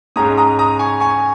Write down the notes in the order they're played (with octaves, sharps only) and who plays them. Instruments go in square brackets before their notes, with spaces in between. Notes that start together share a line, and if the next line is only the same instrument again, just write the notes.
[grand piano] G#2 G#3 C#4 A#5 D#6
A#5 D#6
A#5 D#6
G#5 C#6
G#5 C#6